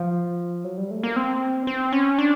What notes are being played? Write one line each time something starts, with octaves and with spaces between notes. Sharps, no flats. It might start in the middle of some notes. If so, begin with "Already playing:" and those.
Already playing: F3
F#3
G3
A3
A#3
C4
C4
C#4
D4